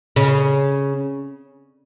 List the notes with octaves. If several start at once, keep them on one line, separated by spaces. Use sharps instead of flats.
C#3